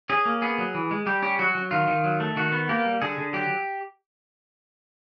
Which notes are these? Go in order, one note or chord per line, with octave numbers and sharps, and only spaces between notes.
C#4 G#4
A#3
B3 G#4
F#3
E3
G#3
G3 G4
C#4 G4
F#3 F#4
F#3
D#3 F4
D#3
F#3
A3
D#3 F#4
B3
A#3 G4
G3
D3 G#4
D3
F#3 G4